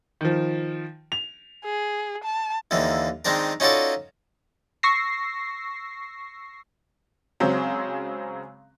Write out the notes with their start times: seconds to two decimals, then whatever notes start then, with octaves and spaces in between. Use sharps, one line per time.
0.21 D#3 F3
1.12 F7
1.65 G#4
2.24 A5
2.71 D#2 D3 E3 A#3
3.25 D#3 G#3 C4 D4 A#4
3.60 C#4 D#4 F4 F#4 A4 D5
4.83 C#6 E6 A#6 C7
7.40 C#3 F#3 G#3 C4